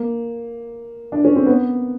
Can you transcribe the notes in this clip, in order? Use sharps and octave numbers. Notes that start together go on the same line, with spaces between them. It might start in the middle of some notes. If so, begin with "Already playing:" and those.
Already playing: A#3
D4
C#4
C4
B3